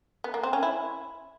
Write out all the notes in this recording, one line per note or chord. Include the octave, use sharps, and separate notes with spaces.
B3
A#3
C4
C#4
E4